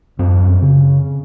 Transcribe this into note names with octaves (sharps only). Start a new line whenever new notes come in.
F#2 C4
C#3